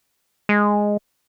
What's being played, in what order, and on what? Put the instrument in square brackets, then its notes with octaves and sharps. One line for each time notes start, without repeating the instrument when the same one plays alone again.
[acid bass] G#3